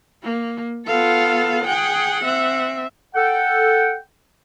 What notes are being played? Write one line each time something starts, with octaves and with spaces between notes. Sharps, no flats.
A#3
B3 F4 A4 F5
G#4 F#5 G5
C4 E5
A4 F#5 G5